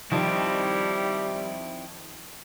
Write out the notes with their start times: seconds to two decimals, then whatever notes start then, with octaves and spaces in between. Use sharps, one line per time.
0.11 D#3 F3 G3 C4 E4